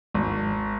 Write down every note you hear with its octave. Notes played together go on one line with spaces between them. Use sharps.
G#1